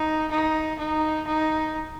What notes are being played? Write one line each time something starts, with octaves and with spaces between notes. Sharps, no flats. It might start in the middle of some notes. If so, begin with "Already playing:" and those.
Already playing: D#4
D#4
D#4
D#4